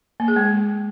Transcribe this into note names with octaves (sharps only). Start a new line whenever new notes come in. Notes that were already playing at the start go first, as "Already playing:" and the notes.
A#3
G#4
G#3